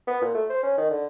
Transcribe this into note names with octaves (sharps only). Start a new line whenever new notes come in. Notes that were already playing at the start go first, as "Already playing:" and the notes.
B3
A#2
A3
C5
C#4
D#3
D3